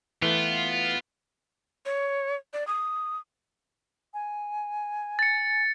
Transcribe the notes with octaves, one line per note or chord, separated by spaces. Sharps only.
E3 A3 B3 F4
C#5
D5
D#6
G#5
A6 C#7